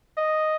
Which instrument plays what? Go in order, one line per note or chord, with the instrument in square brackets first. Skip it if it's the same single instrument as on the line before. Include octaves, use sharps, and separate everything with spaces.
[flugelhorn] D#5